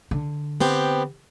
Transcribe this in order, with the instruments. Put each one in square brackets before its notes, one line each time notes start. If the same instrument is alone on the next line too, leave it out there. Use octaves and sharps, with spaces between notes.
[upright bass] D3
[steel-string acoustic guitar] B3 C4 G4